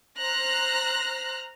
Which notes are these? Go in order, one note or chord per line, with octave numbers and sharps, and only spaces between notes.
C5 A#5 F6 F#6 A#6